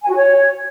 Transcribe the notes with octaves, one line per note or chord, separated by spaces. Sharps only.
G#5
F#4
C#5